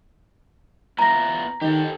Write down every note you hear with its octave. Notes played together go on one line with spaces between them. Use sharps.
B3 E4 F4 A#5 A#6
D#3 G4 A4